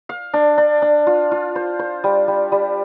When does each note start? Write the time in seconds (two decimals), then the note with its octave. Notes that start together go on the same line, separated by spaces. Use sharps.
0.09 F5
0.34 D4
0.58 D4
0.82 D4
1.07 F4
1.32 F4
1.55 C5
1.79 C5
2.04 G3
2.28 G3
2.52 G3